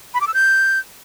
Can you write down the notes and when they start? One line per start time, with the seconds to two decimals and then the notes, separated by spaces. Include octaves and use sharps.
0.14 B5
0.21 D6
0.27 E6
0.34 G6